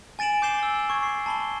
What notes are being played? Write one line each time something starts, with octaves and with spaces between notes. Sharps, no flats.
G#5 A6 D7 E7 F#7
D6 G6 C7 E7 G7
E6
C#6 G#6
C7
A5 B5 G7